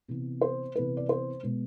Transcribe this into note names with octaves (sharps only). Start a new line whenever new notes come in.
C3 E3 B3
C5
C3 E3 B3 B4
D5
C5
B2 G#3 B3